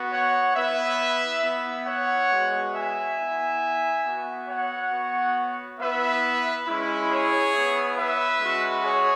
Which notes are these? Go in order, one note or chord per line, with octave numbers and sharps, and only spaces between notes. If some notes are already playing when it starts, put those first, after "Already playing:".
Already playing: B3 F#4
C#5 F#5
B3 E4 B4 E5
B3 E4
C#5 F#5
G#3 B3 F#4
E5 G#5
B3 E4
B3 F#4
C#5 F#5
B3 F#4
B3 E4 B4 E5
G#3 C#4 E4
G#4 C#5
E4
B3
B4 E5
G#3 C#4 F#4
G#4 C#5